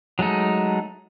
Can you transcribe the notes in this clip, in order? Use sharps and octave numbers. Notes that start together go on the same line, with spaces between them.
F#3 G#3 A3 D#4